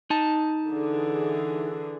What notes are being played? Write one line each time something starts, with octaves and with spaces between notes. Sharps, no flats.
D#4 A5
D3 E3 G#4